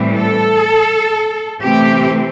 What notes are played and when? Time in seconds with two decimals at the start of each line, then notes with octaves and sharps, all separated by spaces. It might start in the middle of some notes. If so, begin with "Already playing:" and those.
Already playing: A2 E3 G3 C4
0.15 A4
1.62 C3 E3 A3 C4 G4